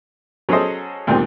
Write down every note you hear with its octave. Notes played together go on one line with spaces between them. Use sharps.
F#3 C#4 G#4 A4 C5 D#5
D2 A#2 D#3 G3 C4